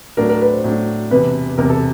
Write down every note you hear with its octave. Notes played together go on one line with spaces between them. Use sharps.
A2 F#3 A3 D4 A#4
A#4
B4
C5
A2 F#3 A3 D4
E1 E2 C3 B4
E1 E2 C3 A#4
A4